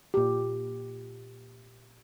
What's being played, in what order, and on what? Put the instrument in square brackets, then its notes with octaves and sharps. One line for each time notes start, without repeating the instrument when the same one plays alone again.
[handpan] A#2 G4